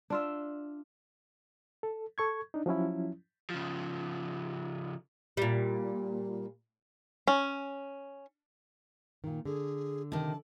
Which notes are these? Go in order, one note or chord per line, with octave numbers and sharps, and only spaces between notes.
D4 F4 E5
A4
A4 C#6 G#6
D4 D#4
F3 F#3 C#4 E4
C#3 F3
A#2 G3
C#4
A#2 D#3
D3 G#4
C3 D#3 A5